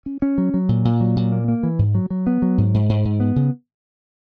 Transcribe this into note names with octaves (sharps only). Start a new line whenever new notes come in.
C#4
C#4
F#3
F#3
A#2
A#2
F#3
A#2
A#3
A#3
E3
G#2
F#3
F#3
B3
F#3
G#2
G#2
G#2
G#2
B3
C#3